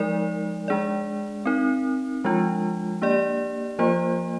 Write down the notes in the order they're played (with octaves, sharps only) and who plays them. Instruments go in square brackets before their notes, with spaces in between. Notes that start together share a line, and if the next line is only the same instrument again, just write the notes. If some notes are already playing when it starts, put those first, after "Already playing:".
Already playing: [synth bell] F3 G#3 D#4 A#4 D5
G#3 D4 G#4 D5
C4 D#4 A#4
F3 G#3 D4 F4
A#3 D4 G4 D5
F3 A#3 F4 C5